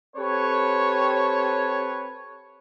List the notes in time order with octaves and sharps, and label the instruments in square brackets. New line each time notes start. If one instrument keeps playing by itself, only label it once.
[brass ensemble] C4 G4 A4 B4 C#5